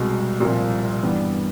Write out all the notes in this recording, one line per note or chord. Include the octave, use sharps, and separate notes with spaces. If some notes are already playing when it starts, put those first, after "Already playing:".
Already playing: C2 B2 G#3
C2 A#2 F3
G2 E3 G3 B3